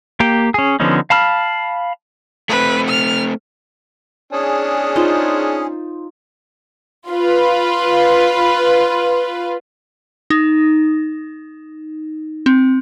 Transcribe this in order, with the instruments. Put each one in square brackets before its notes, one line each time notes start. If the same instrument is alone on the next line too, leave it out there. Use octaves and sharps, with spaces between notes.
[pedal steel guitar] A#3 G4 G5
C#4 G#4
D3 F3 B3 C#4 D#4
F5 A5 B5 F6
[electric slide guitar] A3 C4 [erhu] B4
[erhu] F6
[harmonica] C#4 D4 [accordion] G#4
[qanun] D#4 F4 C5
[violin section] F4 B4
[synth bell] D#4
C4